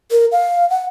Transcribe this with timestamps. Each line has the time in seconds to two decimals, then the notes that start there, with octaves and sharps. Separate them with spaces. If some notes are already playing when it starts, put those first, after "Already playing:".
0.11 A#4
0.32 F5
0.70 F#5